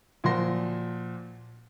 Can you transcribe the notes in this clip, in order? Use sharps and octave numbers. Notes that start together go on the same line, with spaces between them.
A#2 F3 F4 F#4 C6 A#6